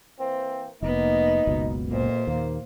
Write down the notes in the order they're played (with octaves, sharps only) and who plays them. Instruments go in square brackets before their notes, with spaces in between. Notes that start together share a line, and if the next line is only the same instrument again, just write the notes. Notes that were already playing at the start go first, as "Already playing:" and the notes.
[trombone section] E3 A#3 C4
[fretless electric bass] F1 [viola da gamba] A#3 B3 [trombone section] D#4
[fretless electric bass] F#1 C#2 B2
[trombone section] A1 F2 [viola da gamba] A#2 C5
[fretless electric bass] D#2 [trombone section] A#3